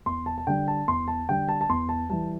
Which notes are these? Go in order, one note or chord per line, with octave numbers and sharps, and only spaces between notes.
E2 C6
A5
A5
D3 G3 G5
A5
E2 C6
A5
D3 G3 G5
A5
A5
E2 C6
A5
E3 G3 A5